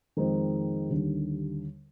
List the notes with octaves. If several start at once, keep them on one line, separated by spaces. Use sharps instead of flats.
F2 D#3 G#3 C4 D#4
D#2 D3 G3